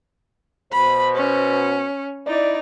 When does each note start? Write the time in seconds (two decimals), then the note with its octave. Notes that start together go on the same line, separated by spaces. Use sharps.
0.72 B2 C5 B5
1.15 C#4
2.27 D#4 E4 D5